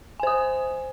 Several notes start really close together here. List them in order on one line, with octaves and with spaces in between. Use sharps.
G#5 C5 D#6